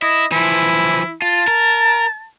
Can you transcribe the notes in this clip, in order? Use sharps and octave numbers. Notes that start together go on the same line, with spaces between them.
E4 D#5
E3 F3 E4
F4 A5
A#4